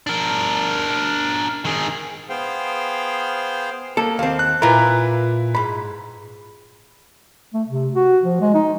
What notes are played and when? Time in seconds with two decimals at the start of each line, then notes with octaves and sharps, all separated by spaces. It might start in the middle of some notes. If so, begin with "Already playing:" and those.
0.07 D4 A#4
1.65 D#3 G#4
2.30 B3 G#4 C5 F5 G5
3.97 A#3 A4
4.19 D#2 C4 F5
4.39 F#6
4.62 A#2 E4 F4 A#4 B4
5.55 G#2 B5
7.53 A3
7.68 C3
7.94 F#4
8.24 F3
8.41 G#3
8.54 D#4